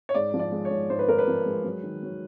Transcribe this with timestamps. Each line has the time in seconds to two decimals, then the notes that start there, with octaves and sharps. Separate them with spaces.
0.09 C#5
0.14 G#2 D5
0.34 F3
0.39 D5
0.52 G#3
0.65 C#5
0.71 G#2
0.90 G#2 C5
0.99 B4
1.08 G#2 A#4
1.18 B4
1.27 F3
1.46 G#3
1.64 F#3
1.83 D#3
2.03 F#3